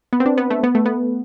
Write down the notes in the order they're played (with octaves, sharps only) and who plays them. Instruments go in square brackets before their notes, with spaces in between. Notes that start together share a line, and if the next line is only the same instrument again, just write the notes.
[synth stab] B3
C4
D4
B3
A3
B3
A3
B3